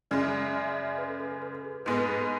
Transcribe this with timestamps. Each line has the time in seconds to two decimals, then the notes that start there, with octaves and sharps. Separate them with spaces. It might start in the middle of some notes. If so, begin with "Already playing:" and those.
0.11 F#2 C#3 G#3 D5
0.20 E5
0.30 D5
0.39 E5
0.49 D5
0.58 E5
0.68 D5
0.78 E5
0.87 D5
0.98 B4
1.09 A4
1.20 A4
1.31 A4
1.42 B4
1.65 G#4
1.85 G#2 G#3 B3 B4
1.96 A4
2.08 G#4
2.19 A4